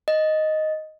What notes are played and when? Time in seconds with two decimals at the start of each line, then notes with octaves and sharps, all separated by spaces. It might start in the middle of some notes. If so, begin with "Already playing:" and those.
0.08 D#5